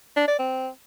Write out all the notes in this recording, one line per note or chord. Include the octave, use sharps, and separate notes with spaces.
D4
D5
C4